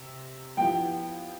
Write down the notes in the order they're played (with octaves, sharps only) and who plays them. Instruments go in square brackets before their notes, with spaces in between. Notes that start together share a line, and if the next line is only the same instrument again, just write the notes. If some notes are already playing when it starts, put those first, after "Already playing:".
Already playing: [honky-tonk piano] C3
[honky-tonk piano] F3 B3 E4 G4 [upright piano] G5